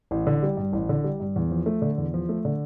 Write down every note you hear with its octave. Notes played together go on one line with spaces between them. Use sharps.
A1
D3
G3
G2
A1
D3
G3
G2
E2
F3
A3
D3
E2
F3
A3
D3